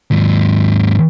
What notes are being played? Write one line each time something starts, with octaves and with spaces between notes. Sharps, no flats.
D#2 G#2